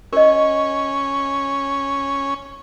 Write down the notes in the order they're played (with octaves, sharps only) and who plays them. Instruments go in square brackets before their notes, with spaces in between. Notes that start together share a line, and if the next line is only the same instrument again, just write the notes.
[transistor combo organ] C#4 [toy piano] A#4 D#5